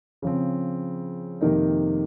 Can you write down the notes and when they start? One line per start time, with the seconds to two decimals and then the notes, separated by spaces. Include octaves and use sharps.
0.22 C#3 F3 C4
1.41 F2 C3 D#3 A#3 D#4